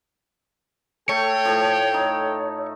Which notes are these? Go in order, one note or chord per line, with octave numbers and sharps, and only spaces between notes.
A3 A4 C#5 G5
A2 F3
D#4